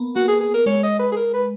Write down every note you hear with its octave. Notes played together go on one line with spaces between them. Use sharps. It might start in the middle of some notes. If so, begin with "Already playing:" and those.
Already playing: A#3 B3
A#3 F#4
G#4
G#4
A#4
G#3 C#5
D#5
B4
G#4
A#4
B4